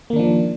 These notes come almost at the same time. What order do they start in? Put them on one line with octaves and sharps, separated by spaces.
A#3 D#3 D4 F3